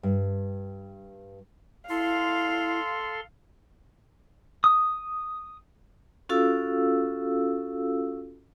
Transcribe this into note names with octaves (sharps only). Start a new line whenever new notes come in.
G2
E4 A4 F5 C6
D#6
C#4 F4 F#4 A4 F5 E6